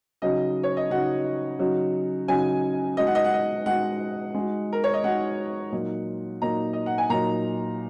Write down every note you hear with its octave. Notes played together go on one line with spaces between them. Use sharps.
C#3 F#3 D#4 F#4 D#5
C#5
D#5
C#3 F#3 D#4 F#4 F#5
C#3 F#3 D#4 F#4
C#3 F#3 D#4 F#4 G#5
G#3 D#4 F#4 D#5
F#5
D#5
F#5
D#5
G#3 D#4 F#4 F#5
G#3 D#4 F#4
A#4
C#5
D#5
G#3 D#4 F#4 F#5
A#2 F#3 D#4
A#2 F#3 D#4 A#5
D#5
F#5
G#5
A#2 F#3 D#4 A#5